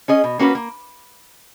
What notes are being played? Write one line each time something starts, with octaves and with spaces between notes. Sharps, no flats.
C#4 G#4 D#5
B2
A#3 C#4 F#4 B4
A#3